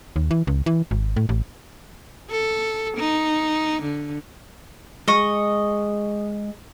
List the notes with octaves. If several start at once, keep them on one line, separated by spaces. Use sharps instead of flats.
D#2
E3
C#2
E3
G#1
A2
A1
A4
D#4
D3
G#3 G#4 D#5 C#6